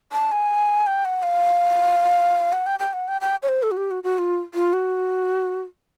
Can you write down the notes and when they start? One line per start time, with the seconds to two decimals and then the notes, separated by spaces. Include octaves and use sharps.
0.12 A5
0.32 G#5
0.87 G5
1.05 F#5
1.23 F5
2.53 F#5
2.66 G5
2.79 G5
2.93 F#5
3.08 G5
3.21 G5
3.43 C#5
3.49 C5
3.63 A4
3.71 F#4
3.77 G4
3.91 F#4
4.04 F#4
4.18 F4
4.54 F4
4.73 F#4